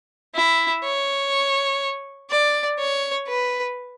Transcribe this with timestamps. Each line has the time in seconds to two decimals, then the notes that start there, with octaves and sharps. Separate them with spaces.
0.35 E4
0.83 C#5
2.30 D5
2.79 C#5
3.28 B4